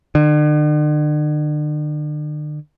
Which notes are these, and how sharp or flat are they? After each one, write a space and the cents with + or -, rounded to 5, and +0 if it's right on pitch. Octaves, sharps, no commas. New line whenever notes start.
D3 +40